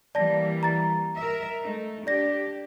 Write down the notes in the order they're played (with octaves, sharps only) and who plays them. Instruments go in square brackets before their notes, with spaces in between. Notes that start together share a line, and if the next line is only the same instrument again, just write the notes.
[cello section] E3 G3 A#3 [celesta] D5 A5 A#6
[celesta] A#5 A6
[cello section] A#4 E5
A3 D#4
[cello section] D4 G4 [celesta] D5 A#6